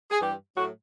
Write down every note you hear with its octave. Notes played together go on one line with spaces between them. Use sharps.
G#4
G2 E3 G3 G4
A2 F#3 A3 F#4